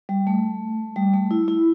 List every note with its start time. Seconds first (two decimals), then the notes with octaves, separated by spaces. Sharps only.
0.09 G3
0.27 A3
0.96 G3
1.13 A3
1.31 E4
1.48 E4